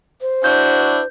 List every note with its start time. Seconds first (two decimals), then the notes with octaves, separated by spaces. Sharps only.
0.21 C5
0.44 D4 E4 F#4 G6